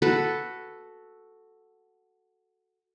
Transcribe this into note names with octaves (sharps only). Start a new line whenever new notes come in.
F#4 A4 B4